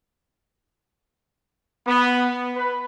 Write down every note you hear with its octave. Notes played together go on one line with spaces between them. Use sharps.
B3
B4